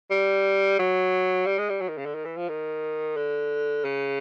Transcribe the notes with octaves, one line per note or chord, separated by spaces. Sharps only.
G3
F#3
G3
G#3
G3
F#3
D#3
C#3
D3
D#3
E3
F3
D#3
D3
C#3